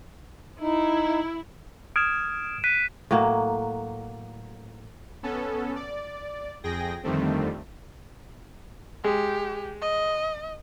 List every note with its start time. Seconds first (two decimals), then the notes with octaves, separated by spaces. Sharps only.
0.61 D#4 E4
1.96 D#6 F6 G#6 D7 E7
2.64 F#6 B6 D#7
3.11 A2 F#3 A#3
5.23 B3 C#4 A4
5.76 D5
6.64 F2 G#4 G5 A#6
7.03 F2 D3 D#3 G3 A3 C4
9.04 G#3 G4
9.81 D#5